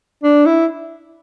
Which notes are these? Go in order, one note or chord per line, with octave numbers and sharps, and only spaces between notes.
D4
E4